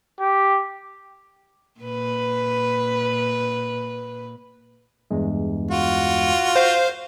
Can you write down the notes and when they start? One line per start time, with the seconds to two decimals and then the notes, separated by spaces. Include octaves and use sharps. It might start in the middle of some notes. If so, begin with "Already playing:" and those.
0.20 G4
1.80 A#2 B4
5.11 E2 G2 G#3
5.71 F4 F#4
6.56 C5 F5